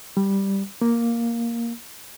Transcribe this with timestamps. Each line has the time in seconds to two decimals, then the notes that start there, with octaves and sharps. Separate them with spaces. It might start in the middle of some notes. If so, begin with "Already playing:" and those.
0.17 G3
0.82 A#3